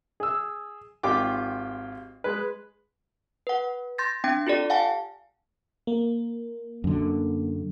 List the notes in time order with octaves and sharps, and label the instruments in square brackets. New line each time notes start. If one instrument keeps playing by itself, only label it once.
[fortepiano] G#4 E6
G#1 F4 G4 G5 D6
G#3 B4
[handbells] B4 F#5
C6 G6 A6 A#6
C4 D4 G5
F4 G4 A4 D5
F5 F#5 G#5 A5
[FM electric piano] A#3
[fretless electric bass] F#2 D3